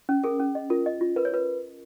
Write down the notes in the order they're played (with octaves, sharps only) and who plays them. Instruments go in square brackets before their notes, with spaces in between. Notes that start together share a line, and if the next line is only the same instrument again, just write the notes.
[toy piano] C#4
[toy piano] G#4 [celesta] A#4
[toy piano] C#4
D#5
[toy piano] F4 [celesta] A#4
[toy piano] D#5
F4
[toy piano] A#4 [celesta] B4
[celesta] C#5
[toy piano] F4 [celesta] B4